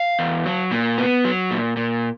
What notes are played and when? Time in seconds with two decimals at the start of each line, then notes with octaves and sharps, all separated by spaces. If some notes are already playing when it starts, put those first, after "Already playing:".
Already playing: F5
0.19 E2
0.46 F#3
0.71 A#2
0.98 B3
1.25 F#3
1.51 A#2
1.77 A#2